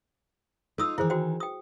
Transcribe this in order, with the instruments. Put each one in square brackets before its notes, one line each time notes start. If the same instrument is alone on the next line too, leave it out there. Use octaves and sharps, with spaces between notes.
[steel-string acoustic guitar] D#4 F4 [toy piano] A4 D#6 E6
[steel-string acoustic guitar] D#3 E3 [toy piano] E4 G#4 C5
[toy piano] F#4 C5 G5
G5 D#6